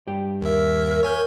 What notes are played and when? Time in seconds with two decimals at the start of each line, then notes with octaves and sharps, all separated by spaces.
0.07 G2 G4 G5
0.41 D#2 A#4 E5
1.03 C#5 G#5 G6